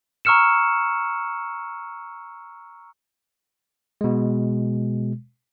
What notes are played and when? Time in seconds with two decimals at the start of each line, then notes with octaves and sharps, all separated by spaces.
0.25 A#5 C#6 E6 F6 C#7 E7
4.01 B2 G#3